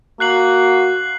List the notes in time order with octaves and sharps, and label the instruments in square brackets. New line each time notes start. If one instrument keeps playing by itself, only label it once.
[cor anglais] A#3 [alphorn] F#4 [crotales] F#6 C7 F#7